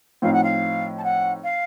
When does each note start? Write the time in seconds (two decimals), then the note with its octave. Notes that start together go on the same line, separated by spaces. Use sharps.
0.22 A2 F3 C4 D#4 F5
0.33 F#5
0.43 F5
0.98 A5
1.03 F#5
1.43 F5